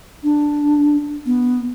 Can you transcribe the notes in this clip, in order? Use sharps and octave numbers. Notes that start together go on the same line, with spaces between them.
D4
B3